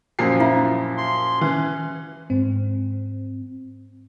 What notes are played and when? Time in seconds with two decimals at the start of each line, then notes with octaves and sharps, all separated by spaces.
0.19 F#2 A#2 F3 C7
0.40 E4 F4 E5
0.97 C6
1.41 E3 C#4
2.30 G#2 C4